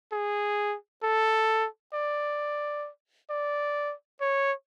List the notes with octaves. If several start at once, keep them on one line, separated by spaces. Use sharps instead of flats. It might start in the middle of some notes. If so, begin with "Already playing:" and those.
G#4
A4
D5
D5
C#5